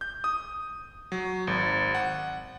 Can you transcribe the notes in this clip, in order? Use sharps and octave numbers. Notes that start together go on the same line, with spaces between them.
G6
D#6
F#3
G#1
F#5